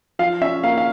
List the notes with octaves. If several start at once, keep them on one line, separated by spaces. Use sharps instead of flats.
F3 F5
C#4 E5
A#3 F5
F5